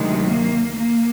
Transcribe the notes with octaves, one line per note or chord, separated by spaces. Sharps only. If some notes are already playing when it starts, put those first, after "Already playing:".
Already playing: D2 C3 D#3 F#3 G#3
A#3
A#3